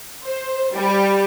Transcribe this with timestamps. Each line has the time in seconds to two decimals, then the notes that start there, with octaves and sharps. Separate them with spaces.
0.24 C5
0.75 G3